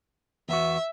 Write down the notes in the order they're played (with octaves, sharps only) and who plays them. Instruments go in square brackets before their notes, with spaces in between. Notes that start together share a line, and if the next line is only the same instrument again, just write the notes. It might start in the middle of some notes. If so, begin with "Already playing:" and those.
[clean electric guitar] E2 B3 F#4 [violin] E5